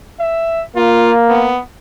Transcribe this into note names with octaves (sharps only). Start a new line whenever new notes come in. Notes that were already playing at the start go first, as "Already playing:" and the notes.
E5
A#3 F4
B3